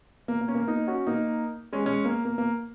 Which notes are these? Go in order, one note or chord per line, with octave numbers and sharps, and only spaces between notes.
A#3
A#3
C#4
A#3
A#3 D#4
C#4 F#4
A#3 D#4
G#3 C#4
G#3 C#4
A#3
A#3
A#3